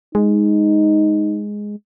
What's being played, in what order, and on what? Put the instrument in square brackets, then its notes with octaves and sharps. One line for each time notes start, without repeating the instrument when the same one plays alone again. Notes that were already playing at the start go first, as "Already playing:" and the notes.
[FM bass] G#3 [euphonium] D#4